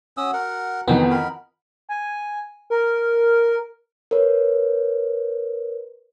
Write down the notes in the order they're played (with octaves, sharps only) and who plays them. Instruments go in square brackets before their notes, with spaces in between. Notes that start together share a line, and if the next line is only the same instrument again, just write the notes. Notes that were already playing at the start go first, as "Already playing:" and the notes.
[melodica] C#4 D#6 E6 [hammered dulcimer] F#4
[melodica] A#4 F#5
[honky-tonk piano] F2 D#3 E3 [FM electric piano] B3 [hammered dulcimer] D#4 F#5
[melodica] A#4 B5
[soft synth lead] G#5
A#4
[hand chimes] A#4 B4 C#5